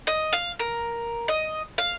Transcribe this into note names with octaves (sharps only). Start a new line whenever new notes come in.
D#5
F5
A#4
D#5
F5